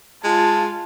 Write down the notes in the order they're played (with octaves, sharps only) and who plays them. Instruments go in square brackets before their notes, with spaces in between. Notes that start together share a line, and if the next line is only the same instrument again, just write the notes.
[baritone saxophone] G#3 [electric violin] F4 [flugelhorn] A5